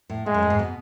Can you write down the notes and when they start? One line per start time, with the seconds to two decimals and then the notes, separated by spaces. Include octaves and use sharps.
0.10 A2
0.26 A2 G#3
0.34 F#2
0.43 A2
0.50 G#2
0.59 B2